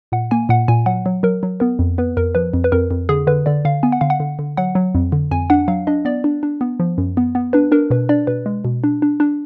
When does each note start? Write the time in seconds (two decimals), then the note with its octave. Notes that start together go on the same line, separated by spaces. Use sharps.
0.12 A#2 F#5
0.31 A#3 G#5
0.49 A#2 F#5
0.68 A#2 G#5
0.86 F#3 F#5
1.06 F#3
1.23 F#3 A#4
1.43 F#3
1.60 B3 A#4
1.79 F2
1.98 B3 B4
2.17 F2 A#4
2.35 F3 B4
2.54 F2
2.64 B4
2.72 F2 A#4
2.91 F2
3.09 D3 G#4
3.27 D3 B4
3.46 D3 D5
3.65 D3 F5
3.83 B3 G#5
3.92 F#5
4.01 D3 F5
4.10 F#5
4.20 D3
4.39 D3
4.57 F#3 F#5
4.75 F#3
4.95 F2
5.12 D3
5.31 F2 G#5
5.50 D4 F#5
5.68 F#3 F5
5.87 D4 D#5
6.05 B3 D5
6.24 D4
6.43 D4
6.61 B3
6.80 F3
6.98 F#2
7.17 B3
7.35 B3
7.53 D4 B4
7.72 D4 A#4
7.90 B2 B4
8.09 D4 D5
8.27 B2 B4
8.46 G#3
8.65 B2
8.84 D4
9.02 D4
9.20 D4